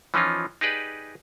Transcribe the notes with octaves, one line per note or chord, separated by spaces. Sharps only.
E3 F3 C#4 D#4 F4
D#4 G4 G#4 B4 D5